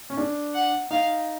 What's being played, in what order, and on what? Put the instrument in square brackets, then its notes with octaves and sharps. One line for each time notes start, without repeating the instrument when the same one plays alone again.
[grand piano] C#4
D4
[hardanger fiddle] F#5
[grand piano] D#4 [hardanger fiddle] F5